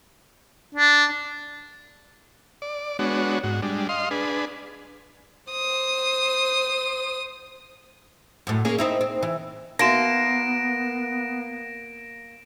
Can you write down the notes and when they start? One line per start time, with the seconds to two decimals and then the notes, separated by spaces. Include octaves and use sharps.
0.75 D4
2.62 D5
2.99 G#3 B3 D4 F#4 C#5
3.44 G#2 F#4
3.62 G3 G#3 D4
3.89 D#5 F5 C6
4.11 D4 G#4 B4
5.51 C5 D#6
8.47 F#2 A2
8.65 A#3 C#4 G#4
8.78 C4 D#4 E4
9.01 C4
9.23 E3
9.79 A#3 B3 D#4 F#4 E5 A#6 D7 E7